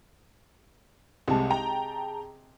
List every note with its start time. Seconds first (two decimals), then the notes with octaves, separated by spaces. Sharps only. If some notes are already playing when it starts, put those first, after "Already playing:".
1.28 C2 C3 G#3 G#4 A5
1.50 G5 A#5